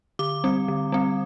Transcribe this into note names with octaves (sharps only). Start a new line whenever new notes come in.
D3 D6
G3 C4
D3
G3 C4